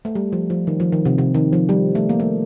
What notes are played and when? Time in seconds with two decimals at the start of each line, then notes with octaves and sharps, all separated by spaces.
0.05 A3
0.15 G3
0.32 F3
0.50 F3
0.67 D#3
0.80 F3
0.92 D#3
1.05 C3
1.18 C3
1.35 D#3
1.53 F3
1.69 G3
1.95 A3
2.09 A#3
2.20 A3